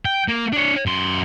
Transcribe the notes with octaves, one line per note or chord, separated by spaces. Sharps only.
G5
A#3
D4 C#5
F#2 C6